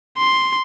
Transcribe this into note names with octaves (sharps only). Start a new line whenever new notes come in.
C6